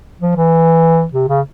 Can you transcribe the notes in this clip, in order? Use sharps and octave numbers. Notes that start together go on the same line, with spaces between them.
F3
E3
C3
C#3